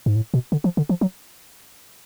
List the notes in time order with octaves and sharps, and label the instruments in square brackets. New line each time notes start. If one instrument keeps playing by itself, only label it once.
[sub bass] G#2
A2
B2
D3
F3
D3
F3
F#3